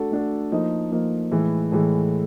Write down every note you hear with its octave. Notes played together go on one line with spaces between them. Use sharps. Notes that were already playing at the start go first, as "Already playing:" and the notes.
Already playing: A3 D4 F#4 A4
A3 D4 F#4 A4
F3 A#3 D#4
F3 A#3 D#4
A2 E3 G#3
A2 E3 G#3